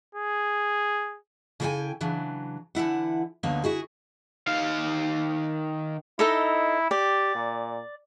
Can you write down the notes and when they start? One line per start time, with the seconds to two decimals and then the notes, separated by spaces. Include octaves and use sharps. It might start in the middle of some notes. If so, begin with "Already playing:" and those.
0.15 G#4
1.60 C#3 E4 A4 F5 G5 G#5
2.01 C#3 E3 F#3 D4
2.75 D3 E3 E4 F#5
3.43 D2 D3 A#3 B3 D#4 C#5
3.64 E4 F#4 G#4
4.47 D#3 F5
6.19 D#4 E4 A4 D#5
6.91 G4 D5
7.35 A#2